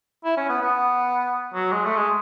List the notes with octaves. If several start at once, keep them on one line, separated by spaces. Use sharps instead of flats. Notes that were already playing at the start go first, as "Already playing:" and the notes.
E4
C#4
B3
B3
F#3
G#3
A3
G#3